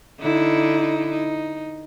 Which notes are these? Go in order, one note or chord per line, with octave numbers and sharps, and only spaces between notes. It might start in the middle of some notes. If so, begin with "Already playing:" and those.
D3 D#4 E4
D#4